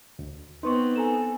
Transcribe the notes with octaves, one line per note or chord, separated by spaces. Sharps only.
D2
B3 C4 D#4 B4 C6 C#6
A4 G#5 A#5 E7